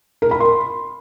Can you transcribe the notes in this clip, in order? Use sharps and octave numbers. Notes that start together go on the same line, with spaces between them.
A#4
B5
C6